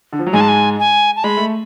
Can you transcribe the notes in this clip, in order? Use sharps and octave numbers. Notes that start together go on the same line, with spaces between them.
D3
F3
F#3
G#2 G#3 G#5
A5
G#5
G#5
A5
G#3 B5
A3